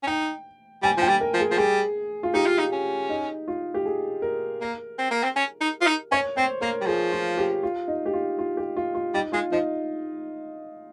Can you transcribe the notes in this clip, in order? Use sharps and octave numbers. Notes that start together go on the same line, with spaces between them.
C#4
D#4 G5
G3 G#5
F3 G5
G3
A#4
F3
G#4
F3
G3 G#4
F4
D#4 G4
F4
D#4
C#4
D#4
F4
G4
G#4
A#4
A#3
C4
A#3
C4
C#4
D#4
F4
D#4
C#4 C#5
C4 C5
A#3 A#4
G3
F3 G#4
F4
G4
F4
D#4
G4
F4
F4
G4
F4
F4
G3 D#4
G#3 F4
F3 D#4